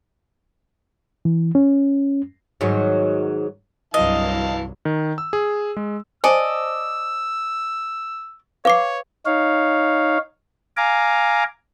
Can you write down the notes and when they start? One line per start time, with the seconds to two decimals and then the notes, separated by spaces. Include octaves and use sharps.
1.25 E3
1.55 C#4
2.61 G#2 D#3 F#3
3.94 C2 G2 E3 F#3 D#5 F5 A5
4.85 D#3
5.18 E6
5.33 G#4
5.77 G#3
6.24 C5 D5 D#5 G#5 A5 E6
8.65 B4 C#5 F5 D6 C7
9.26 D#4 C#5 F5
10.77 F5 G#5 A#5 D6